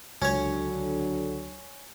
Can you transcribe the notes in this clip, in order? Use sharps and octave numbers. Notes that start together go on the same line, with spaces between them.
C#2 D3 F#3 C#4 C#5